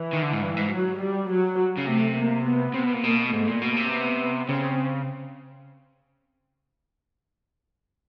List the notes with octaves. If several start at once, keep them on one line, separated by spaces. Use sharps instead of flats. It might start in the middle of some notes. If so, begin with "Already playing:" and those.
Already playing: E3
D#3
D3
G#2
G2 E3
G#2
F#3
G3
F#3
C#3
C3 A3
A#3
B3
C3
B2
A#2
B2 A#3
G#2 A3
A#2
B2 A#3
C3
B3
C#3 C4